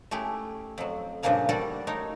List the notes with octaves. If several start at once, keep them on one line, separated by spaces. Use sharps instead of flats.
A3 C#4 E4 G4 G#4
F2 F#3
G2 A#2 C#3 F3 A#3 G#4
G3 F#4 A4 C#5 D5 F#5
A3 D#4 A#4 C#5